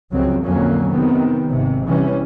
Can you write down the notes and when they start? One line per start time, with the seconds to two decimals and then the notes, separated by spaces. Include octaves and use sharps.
0.12 C#2 F#2 C3 F3 F#3 C4
0.44 F2 A#2 D3 F#3 A#3 C#4
0.89 C3 D#3 B3 C4
1.51 G#1 G#2 C3
1.88 C3 E3 G3 C#4